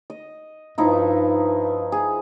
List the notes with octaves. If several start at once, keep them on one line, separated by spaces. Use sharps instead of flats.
D#5
G2 F3 D#4 E4
G#4